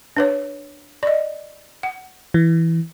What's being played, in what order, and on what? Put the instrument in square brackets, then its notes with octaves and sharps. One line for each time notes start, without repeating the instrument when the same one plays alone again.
[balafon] D4 B4 C#5
D5 D#5
F#5
[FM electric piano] E3